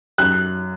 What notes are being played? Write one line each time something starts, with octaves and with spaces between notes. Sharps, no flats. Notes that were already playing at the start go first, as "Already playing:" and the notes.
F#2 F#6